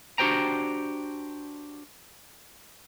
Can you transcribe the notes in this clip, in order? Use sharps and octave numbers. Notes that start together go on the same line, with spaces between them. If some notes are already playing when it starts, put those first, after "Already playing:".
D4 F#4 G4 C5 G5 A#5